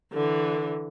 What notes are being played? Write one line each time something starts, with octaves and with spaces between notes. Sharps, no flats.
D3 E3